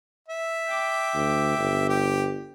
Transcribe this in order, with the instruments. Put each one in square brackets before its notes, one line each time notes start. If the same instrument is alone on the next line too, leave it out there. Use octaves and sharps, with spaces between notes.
[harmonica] E5
[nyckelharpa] G5 D6
[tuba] D2
G1
[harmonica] G4